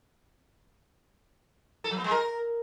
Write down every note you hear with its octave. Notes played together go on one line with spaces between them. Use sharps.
A4
F#3
B3
G#3
A#4